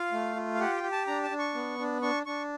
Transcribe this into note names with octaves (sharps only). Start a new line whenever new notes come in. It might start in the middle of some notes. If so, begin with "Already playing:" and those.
Already playing: F4 F5
A3
F4
F5
G4 F#5
G5
G4
A5
D4 A#5
A5
D4
C#6
B3
D4
D4 C#6
D4 C#6